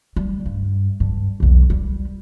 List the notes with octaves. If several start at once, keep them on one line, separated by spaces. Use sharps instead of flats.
G3
G2
G2
B1 E2
G3